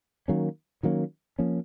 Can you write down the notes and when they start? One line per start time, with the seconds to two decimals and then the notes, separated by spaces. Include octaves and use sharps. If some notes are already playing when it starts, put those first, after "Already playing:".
0.28 D#3 F#3 A#3 C#4
0.83 D#3 F#3 A#3 C#4
1.39 F3 A#3 C#4